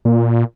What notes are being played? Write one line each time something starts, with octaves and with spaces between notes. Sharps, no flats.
A#2